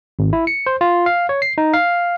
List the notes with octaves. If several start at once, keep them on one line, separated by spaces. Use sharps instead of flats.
G#1
E4
C#7
C5
F4
F5
C#5
C7
D#4
F5